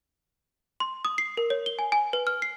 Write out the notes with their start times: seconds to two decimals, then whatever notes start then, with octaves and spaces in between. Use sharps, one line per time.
0.80 C6
1.05 D#6
1.18 C7
1.37 A#4
1.50 C#5
1.66 G7
1.79 G#5
1.92 G#5
2.13 B4
2.27 F6
2.42 C7